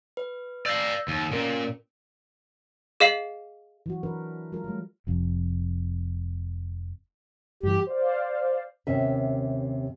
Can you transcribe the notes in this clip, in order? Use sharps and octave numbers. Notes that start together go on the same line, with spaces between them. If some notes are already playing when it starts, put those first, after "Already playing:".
B4
D5 F5 E6 G6 A#6
D#2
A#2 C#4 A#4 D7
G#4 D#5 F5 C7 F#7
E3 F#3 F#4
E3 D4 A#4 B4
F#3 G#3 F4 A#4
G3 A3
F1 F2
G2 E3 G4
C5 D5 F5
D#2 C3 C#4 E5